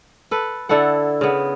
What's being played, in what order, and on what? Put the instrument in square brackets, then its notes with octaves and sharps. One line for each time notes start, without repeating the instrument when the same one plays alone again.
[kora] A4 B4
D3 E4 A4 F#5
C#3 B3